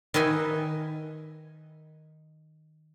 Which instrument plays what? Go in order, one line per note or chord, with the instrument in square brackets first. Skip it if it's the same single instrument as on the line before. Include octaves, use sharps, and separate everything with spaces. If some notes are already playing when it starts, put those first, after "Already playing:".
[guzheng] D#3 B4 D#5 E5 G#5